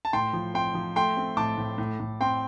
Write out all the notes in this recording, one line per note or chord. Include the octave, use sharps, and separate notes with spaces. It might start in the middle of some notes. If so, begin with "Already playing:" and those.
A5
A2 G5 C6
F3
C4 G5 C6
F3
A3 G5 C6
C4
A2 A5 D6
A2
A2
A2
C4 G5 C6